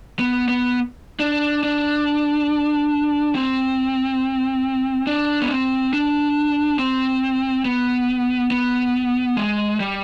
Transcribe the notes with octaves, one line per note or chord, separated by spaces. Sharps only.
B3
B3
D4
D4
C4
D4
B3
C4
D4
C4
B3
B3
G#3
G3